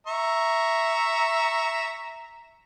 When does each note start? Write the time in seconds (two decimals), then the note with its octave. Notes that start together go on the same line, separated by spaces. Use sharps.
0.07 E5 A#5 C#6